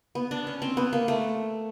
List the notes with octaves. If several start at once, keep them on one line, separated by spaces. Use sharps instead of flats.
B3
D4
C#4
C4
B3
A#3
A3